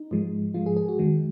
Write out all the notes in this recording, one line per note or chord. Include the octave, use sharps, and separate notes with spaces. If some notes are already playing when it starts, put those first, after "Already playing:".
Already playing: D#4
G#2 F3 G#3
G#2 F3 G#3 F4
G#4
G#4
F#4
F2 D#3 G#3